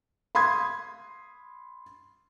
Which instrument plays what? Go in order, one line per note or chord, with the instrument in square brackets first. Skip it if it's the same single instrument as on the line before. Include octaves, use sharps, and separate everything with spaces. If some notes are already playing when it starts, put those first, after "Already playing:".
[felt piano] B5 C6 D#6 G#6